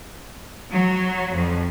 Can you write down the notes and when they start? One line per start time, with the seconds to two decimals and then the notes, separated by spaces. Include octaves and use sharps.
0.70 F#3
1.33 F2